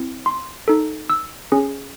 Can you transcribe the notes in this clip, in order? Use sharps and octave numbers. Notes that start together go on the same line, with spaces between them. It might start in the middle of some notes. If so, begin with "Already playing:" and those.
Already playing: C4 E4
C6
D#4 A4
E6
C#4 G#4